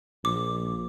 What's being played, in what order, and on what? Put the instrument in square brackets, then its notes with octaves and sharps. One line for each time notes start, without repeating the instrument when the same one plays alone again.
[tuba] A#1 [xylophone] D6